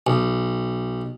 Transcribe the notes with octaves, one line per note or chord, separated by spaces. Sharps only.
B1